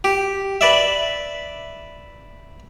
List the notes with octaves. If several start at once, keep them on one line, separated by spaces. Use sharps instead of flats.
G4
B4 D5 E5